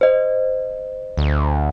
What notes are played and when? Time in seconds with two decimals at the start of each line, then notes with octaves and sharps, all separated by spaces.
0.01 C5 D#5
1.18 D2